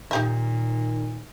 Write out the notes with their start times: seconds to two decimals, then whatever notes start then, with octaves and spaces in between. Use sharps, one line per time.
0.11 A#2 D#3 D#4 G4 E5